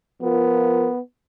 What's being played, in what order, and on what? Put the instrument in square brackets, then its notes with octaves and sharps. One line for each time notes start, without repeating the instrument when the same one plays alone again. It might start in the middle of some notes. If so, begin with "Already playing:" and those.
[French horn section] F3 F4 A#4 [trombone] B3